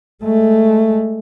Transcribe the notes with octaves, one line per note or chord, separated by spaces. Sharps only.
G#3 A3